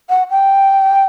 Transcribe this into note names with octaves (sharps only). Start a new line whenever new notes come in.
F#5
G5